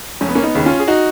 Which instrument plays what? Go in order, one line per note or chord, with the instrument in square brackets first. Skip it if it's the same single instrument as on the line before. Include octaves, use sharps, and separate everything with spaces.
[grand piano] F1 C#4
B3
A#3 C#4
B3 D#4
D#2 C#3
C#4 F4
G#4
D#4 F#4